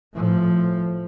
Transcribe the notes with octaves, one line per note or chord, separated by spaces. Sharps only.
A2 F3